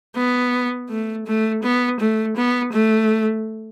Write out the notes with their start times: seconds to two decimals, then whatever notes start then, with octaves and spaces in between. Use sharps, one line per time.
0.16 B3
0.89 A3
1.26 A3
1.63 B3
2.00 A3
2.36 B3
2.72 A3